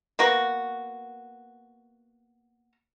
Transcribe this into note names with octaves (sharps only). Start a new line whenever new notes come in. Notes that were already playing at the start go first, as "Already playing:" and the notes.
A#3 B3 F#4